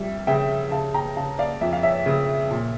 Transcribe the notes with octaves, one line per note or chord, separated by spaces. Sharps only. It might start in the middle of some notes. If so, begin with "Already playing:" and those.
Already playing: F2 G3 E5
C#3 E5 G5
C#3 F5 A5
G5 A#5
C#3 F5 A5
D5 F5
F2 E5
F5
C#5 E5
C#3
A#2